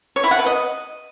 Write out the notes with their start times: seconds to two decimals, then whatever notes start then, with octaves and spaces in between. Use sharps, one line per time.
0.16 C#5
0.24 E4
0.31 F#5
0.39 B4
0.46 D#5